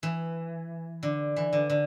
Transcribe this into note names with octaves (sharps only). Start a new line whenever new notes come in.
E3
D3
E3
D3
D3